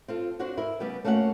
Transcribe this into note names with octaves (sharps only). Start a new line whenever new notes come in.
C4 F4 A4
C4 D4 F#4 C5 F#5
E4 A#4
C#3 G3 B3 G4
A3 A#3 C#4 F#4 E5 F#5